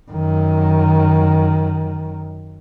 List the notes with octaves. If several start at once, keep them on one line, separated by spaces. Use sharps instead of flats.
F#2 D#3